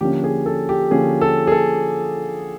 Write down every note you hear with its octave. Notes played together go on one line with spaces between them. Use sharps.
D3 F3 A#3 C#4 G4
G#4
A4
G4
D3 F3 A#3 C#4 G#4
A4
G#4
A4